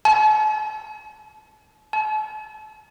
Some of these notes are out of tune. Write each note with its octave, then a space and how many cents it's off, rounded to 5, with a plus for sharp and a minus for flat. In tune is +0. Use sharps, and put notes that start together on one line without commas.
A5 -45
A5 -40